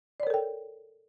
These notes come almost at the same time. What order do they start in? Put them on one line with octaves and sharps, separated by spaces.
D5 C#5 A#4 A4 G5